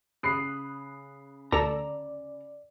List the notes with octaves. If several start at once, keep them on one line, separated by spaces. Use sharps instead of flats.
C#3 B5 D#6 F#6 C7
D2 A4 D5 A#5 E6